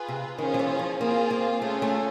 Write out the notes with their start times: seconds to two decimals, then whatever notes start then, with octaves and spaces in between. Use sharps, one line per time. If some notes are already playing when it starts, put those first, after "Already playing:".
Already playing: F4 G#4 B4
0.08 C3
0.38 D#3 C#4 F4 G#4 C5
0.54 F3
0.59 E3
0.79 F3
1.01 A#3 C4 F4 G#4
1.31 A#3
1.62 A3 C#4 F4 G#4
1.82 A3